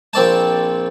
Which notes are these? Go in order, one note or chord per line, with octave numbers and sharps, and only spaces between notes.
A#1 C4 D5 A5